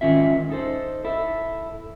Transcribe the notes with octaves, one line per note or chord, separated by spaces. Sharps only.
G#2 D#3 C#4 F4 E5
D#4 A4 C5
E4 A4